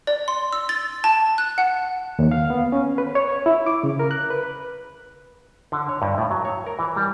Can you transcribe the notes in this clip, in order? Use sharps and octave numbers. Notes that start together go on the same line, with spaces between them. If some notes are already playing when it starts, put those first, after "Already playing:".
D5
C6
E6
A6
A5
F#6
F#5
D#2
F5
B3
C#4
B4
C#5
E4
D6
C#3
A#4
F#6
B4
D3
C#5
G2
A2
F#3
C#5
A#4
E3
G3